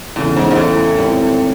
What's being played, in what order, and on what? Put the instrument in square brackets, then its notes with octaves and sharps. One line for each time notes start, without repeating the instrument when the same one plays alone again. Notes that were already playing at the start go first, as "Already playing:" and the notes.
[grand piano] E2 C#3 E3 [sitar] A2
[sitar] G#2
A#2
A2
[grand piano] G#2 D#3 G3 C4